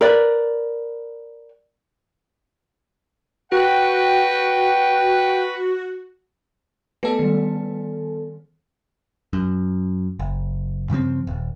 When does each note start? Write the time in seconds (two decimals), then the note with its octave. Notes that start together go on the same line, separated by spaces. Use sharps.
0.01 A#4 B4 D5
3.52 F#4 B4 F#5 G5
7.03 A3 B3 A4 B4 C#7
7.19 D#3 G3
9.33 F#2
10.19 F#1
10.90 G2 C#3 F3 C4
11.27 D#1